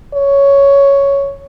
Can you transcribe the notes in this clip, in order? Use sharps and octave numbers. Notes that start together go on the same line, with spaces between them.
C#5